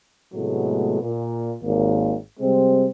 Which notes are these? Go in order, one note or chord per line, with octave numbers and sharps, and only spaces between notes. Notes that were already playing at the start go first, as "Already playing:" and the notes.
A2 C3 F#3 G#3 A3 B3
A#2
G#1 D#2 A#3
C3 G3 G#3 C4